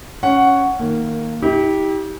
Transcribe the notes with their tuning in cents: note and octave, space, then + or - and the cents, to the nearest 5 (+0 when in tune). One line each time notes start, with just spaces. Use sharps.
C#4 +0 F#5 +0
D#3 +0 A#3 -15
E4 -45 G4 +0